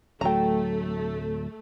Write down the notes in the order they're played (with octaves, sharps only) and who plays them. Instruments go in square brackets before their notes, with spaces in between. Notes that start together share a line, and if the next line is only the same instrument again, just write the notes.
[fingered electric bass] D1 F#3 [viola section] A3 [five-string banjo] G5 A#5